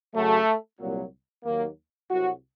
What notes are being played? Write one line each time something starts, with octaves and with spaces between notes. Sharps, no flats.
F#2 C#3 F#3 A3
C2 A#2 F#3
D#2 D#3 F#3 A#3
C2 C3 F#3 F#4